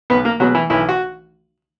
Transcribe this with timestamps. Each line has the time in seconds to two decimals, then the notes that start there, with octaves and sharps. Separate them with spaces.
0.10 B1 B3 B4
0.25 A#3 A#4
0.40 B2 F#3 G#3 B3 F#4
0.55 E3 E4
0.70 B1 E3 E4
0.89 F#4